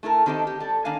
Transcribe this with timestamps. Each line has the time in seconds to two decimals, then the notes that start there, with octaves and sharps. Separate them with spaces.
0.03 A3 E4 A4 A#4
0.26 D#3 C4 G4 A4 D#5
0.47 G4
0.60 G3 A4
0.85 D#3 A#3 D4 F5 G#5